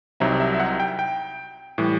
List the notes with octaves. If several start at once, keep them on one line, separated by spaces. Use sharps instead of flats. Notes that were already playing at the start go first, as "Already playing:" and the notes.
C2 C3 F#3 C4 D#4 E5
E5
E5
F#5
G5
G5
A2 E3 G3